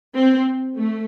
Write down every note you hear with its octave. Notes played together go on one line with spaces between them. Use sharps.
C4
A3